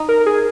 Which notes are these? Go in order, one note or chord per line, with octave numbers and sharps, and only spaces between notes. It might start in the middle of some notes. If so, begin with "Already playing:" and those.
Already playing: D#4
A#4
G#4